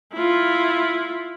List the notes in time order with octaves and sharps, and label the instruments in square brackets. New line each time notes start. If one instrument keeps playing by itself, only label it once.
[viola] E4 F4